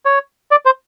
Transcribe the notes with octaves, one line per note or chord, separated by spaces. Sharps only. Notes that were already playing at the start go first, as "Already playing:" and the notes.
C#5
D5
C5